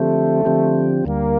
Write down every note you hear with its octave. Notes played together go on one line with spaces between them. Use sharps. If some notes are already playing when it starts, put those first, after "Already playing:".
Already playing: D3 F3 A3 C4 G4
D3 F3 C4 G4
D2 D3 G3 A#3